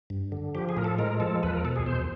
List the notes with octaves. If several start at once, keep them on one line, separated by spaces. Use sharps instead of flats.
G2
D3
F3 G4
G#4
A2 A#4
A4
G#3 A#4
F3 A4
E2 B4
A#4
B2 A4
G#4
E2 C5